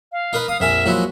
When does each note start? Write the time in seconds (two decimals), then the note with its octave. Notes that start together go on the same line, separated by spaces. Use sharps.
0.12 F5
0.33 D#4 A#4 B4
0.48 F5 D#6
0.60 A#1 F2 A#4 E5 G#5
0.86 F3 F#3 G#3 A#3 E4 F#4